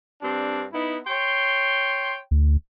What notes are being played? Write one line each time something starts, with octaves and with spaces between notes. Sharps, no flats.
G2 C4 D4
B3 D#4 E4
C#5 G5 C6
D2